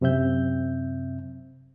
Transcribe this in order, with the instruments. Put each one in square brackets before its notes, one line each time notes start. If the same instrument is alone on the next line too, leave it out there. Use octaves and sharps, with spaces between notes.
[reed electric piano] F#2 C3 C4 E5 G6